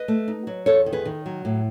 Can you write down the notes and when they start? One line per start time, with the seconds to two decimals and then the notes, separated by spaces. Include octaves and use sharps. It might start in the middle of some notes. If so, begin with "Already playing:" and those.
Already playing: B4 D#5
0.08 A3
0.28 D#4
0.47 F#3
0.66 E2 A4 C#5
0.86 D#3
0.93 G#4 B4
1.05 D#3
1.26 F#3
1.45 A2